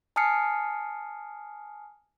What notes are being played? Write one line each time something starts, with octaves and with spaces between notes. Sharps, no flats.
G#5 A5 D#6 F6 C7 C#7